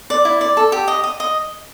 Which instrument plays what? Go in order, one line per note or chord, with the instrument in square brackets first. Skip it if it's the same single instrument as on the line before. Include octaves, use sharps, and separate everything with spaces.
[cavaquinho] D5
E4
D5
A4
G4
D#5
D#5
D#5